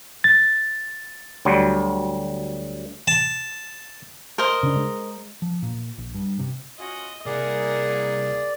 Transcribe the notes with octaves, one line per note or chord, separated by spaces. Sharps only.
A6
D2 F#3 G3
A5
A#4 C5 D#5
C#3 D4
G#3
F3
A#2
A#1
G2
C3
C#4 F4 F#4 D#5
C2 A#3 E4 G#4 A#4 D5 F#5